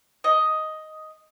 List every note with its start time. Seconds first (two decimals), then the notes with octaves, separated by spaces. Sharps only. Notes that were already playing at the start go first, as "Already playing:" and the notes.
0.24 D#5